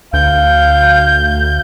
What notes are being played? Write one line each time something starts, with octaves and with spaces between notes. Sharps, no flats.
D2 F5 G6